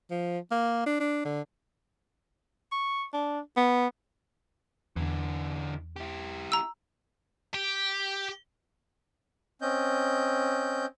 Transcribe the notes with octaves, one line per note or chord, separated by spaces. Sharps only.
F3
A#3
D4
D4
D3
C#6
D4
B3
E2 D3 E3
E4 G4
A#5 E6
G4
C4 C#4 D#5 G6